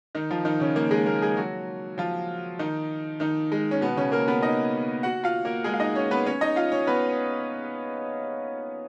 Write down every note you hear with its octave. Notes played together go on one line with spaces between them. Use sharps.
D#3 D#4
F3 F4
D#3 D#4
C#3 C#4
A#3
G#3 G#4
A#3 A#4
G#3 G#4
F#3 F#4
F3 F4
D#3 D#4
D#3 D#4
G#3
C#4
B2 B3
C#3 C#4
A#3 A#4
B3 B4
D#4 D#5
F#4 F#5
F4 F5
A#3 A#4
G#3 G#4
F5
D#4 D#5
C#4 C#5
B3 B4
C#4 C#5
D#4 D#5
F4 F5
C#4 C#5
B3 B4